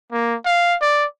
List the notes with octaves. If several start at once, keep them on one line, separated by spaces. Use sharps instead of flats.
A#3
F5
D5